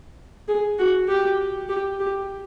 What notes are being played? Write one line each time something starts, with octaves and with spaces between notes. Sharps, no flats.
G#4
F#4
G4
G4
G4